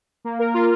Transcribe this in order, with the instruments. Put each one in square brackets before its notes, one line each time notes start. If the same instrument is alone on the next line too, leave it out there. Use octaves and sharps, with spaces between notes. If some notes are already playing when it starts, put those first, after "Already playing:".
[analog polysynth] A#3
A#4
F4